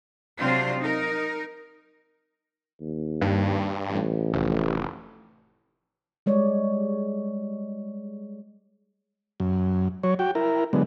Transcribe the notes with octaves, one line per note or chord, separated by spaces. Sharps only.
C3 F#3 C4 D4 F4 C5
D#4 A#4
D#2
G2
A1
F1
G3 G#3 C#5 D5
F#2
F#3 C#5
F#4 G5
E4 A#4
D3 F#3 G#3 B3